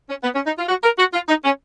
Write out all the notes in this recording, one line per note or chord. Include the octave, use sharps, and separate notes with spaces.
C#4
B3
C#4
D#4
F4
F#4
A#4
F#4
F4
D#4
C#4